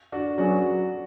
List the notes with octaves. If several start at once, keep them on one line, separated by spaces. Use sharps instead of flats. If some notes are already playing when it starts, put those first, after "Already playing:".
D4 F#4
F#3 C#4 D4 F#4 G#4 B4